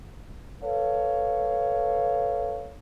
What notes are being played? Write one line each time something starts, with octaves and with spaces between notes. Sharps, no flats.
A4 B4 C#5 F5